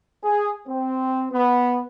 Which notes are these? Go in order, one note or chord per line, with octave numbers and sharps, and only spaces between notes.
G#4
C4
B3